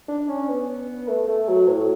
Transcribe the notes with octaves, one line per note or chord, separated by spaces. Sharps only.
D4
C#4
B3
A3
A3
F#3
A2